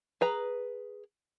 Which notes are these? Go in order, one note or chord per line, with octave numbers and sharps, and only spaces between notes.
G#4 B4 A#5